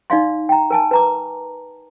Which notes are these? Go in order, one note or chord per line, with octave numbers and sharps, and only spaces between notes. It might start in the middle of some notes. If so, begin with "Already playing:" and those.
D#4 D5 F5 C6
G5 A#5
A#4 G#5 A5
B4 A#5 D6